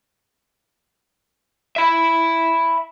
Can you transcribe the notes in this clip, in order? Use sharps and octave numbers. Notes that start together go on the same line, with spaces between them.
E5 B5